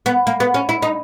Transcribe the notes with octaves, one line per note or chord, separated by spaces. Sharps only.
B3
A#3
B3
C#4
E4
D#4